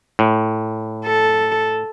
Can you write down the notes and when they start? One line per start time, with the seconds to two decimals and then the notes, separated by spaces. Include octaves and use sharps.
0.19 A2
1.05 A4